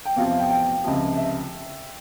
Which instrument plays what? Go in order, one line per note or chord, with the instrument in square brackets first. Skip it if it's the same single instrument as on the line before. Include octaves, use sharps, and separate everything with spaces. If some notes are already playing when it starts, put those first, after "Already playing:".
[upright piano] G5
[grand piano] E2 C3 F3 C4 F4 [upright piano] F5
[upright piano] F5
G5
G5
[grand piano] C#2 C3 F3
[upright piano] E5